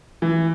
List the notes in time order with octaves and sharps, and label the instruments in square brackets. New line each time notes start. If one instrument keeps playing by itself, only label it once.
[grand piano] E3